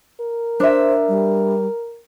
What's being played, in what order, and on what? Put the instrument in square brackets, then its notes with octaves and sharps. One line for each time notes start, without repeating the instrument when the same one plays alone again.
[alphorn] A#4
[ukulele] D4 E5 [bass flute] C5
[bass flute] G3